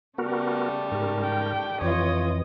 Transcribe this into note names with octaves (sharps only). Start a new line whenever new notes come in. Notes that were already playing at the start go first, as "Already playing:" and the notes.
C#3 G3 A3 B3 F#4 A#4
G#2 G4 A#4
G5
F2 E3 F4 C#5 D#5 D#6